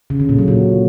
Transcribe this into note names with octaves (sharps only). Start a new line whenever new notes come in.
C#3
D3
A#2
F#3
A#2